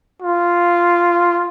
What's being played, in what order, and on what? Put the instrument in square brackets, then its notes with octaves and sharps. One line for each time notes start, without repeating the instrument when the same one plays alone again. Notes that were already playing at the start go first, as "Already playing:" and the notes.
[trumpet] F4